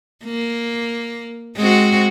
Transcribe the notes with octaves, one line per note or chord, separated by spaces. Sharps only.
A#3
G#3 C4 F#4